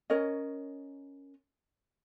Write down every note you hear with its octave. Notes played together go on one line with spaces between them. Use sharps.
C#4 A#4 C#5 D#5